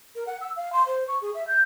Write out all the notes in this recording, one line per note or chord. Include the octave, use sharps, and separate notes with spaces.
A#4
F#5
E6
F5
C6
C5
C#6
G#4
E5
G6